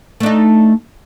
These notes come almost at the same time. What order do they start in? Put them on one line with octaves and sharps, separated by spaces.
A3 D4 D#4